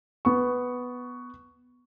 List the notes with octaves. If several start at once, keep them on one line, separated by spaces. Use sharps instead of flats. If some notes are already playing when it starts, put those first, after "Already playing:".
B3 C#6